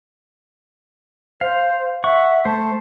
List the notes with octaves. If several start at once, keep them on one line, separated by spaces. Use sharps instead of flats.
C5 F5
E5 F#5 C#6
A3 C5 A5